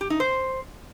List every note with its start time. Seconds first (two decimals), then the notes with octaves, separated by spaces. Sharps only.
0.01 G4
0.10 D#4
0.20 C5